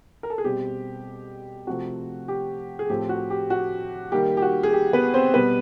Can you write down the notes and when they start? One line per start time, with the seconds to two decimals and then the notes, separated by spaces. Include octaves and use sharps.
0.23 A#4
0.30 A4
0.38 G#4
0.44 B2 G3 C4 G4
1.67 C3 F3 A3 C4 F#4
2.28 G4
2.79 G#4
2.90 A2 F3 A3 C4 G4
3.09 F#4
3.30 G4
3.50 F#4
4.12 D#3 G3 A#3 G4
4.37 G4
4.42 F#4
4.63 G#4
4.73 G4
4.93 B3 B4
5.14 C4 C5
5.34 B2 G3 B3 B4